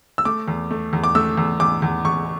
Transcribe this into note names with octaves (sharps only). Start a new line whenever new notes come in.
E6
A3 D6
E2
A3
E2
D6
A3 E6
E2
E2 D6
E2
E2 C#6